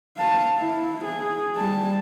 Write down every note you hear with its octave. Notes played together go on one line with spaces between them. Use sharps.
F5 A5
E4
G#4
G3 A5